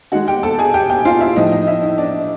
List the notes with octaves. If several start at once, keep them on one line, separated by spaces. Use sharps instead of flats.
D#3 G#3 F#4 F#5
G4 G5
A4 A5
G#4 G#5
G4 G5
G4 G5
F4 F5
E4 E5
A2 F3 A3 D#4 D#5
D#4 D#5
E4 E5
D#4 D#5
D4 D5